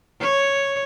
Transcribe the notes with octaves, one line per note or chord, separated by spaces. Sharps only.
C#5